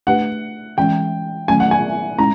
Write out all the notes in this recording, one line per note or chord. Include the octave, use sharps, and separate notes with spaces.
A3 D4 G4 B4 F#5
E3 G#3 C#4 G5
D#3 F#3 A3 C#4 G#5
F#5
G#5
G#3 C#4 E4 A#5